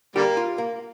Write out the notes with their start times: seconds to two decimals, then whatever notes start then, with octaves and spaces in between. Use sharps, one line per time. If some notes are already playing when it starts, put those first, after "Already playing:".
0.16 D3 G3 A#3 G4
0.37 F4
0.58 A#3